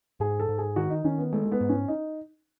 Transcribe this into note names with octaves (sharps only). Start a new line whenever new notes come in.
G#2 G#4
A4
G#2
G#4
D#3 F#4
D#4
D#3 C#4
B3
G#3 A3
A3
B3
G#2
C#4
D#4